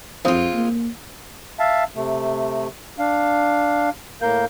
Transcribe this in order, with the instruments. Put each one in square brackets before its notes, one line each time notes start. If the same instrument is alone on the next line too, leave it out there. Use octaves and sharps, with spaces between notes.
[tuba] F2 [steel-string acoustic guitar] G#3 F4 [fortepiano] C4 F5 D#6
[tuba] A#3
[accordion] E5 F5 A5
C3 A3
D4 F5
A2 A#3 A#4 F5 G6